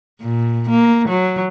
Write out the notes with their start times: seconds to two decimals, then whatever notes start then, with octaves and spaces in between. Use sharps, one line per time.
0.21 A#2
0.69 A#3
1.08 F#3